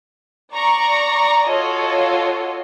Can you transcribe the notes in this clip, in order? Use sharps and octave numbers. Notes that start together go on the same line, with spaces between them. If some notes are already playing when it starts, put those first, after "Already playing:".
D5 A#5 C#6
F4 F#4 A4 C#5 D#5